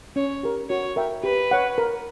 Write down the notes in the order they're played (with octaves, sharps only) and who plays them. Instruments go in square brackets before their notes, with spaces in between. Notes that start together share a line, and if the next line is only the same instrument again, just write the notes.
[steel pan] C#4 [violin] C#5
[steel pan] G4 A#4
[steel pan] F#4 [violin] C#5
[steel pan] A#4 E5 G5
[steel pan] G4 [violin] B4
[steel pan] C#5 F#5
A#4